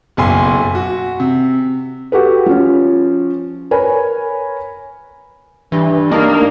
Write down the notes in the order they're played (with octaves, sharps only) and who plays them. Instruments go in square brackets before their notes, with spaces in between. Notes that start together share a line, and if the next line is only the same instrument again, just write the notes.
[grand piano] F#1 B1 G#5 C6
F#4
C3
[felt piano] F#4 G4 A4 B4
F3 C#4
A#4 B4 C#5 G#5 B5
[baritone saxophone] G2 [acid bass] E3
[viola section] A#3 [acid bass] D4 [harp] D#4